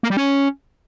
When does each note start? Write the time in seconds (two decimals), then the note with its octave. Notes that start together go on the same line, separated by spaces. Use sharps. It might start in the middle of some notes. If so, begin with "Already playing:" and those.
0.03 A#3
0.10 G3
0.17 C#4